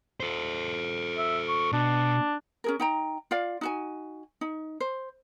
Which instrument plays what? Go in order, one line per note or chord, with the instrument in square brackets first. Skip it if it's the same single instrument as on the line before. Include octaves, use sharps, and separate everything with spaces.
[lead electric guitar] A4 C5
[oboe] E5
C#6
[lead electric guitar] B2 [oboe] D4
[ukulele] C#4 G#4 A#4
D#4 G5 A#5
F4 D5 F5
D#4 F#4 G#5
D#4
C5